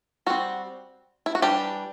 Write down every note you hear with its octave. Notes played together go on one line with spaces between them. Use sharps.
G3 C4 F#4
E4
F#4
E3 G3 D4 G4